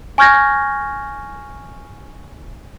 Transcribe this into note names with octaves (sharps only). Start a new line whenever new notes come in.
G#5 C#6 F6 G6 G#6 A#6